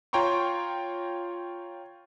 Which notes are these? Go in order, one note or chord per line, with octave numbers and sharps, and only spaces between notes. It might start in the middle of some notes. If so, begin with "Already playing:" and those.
F4 C#5 G5 A#5 C6 C#6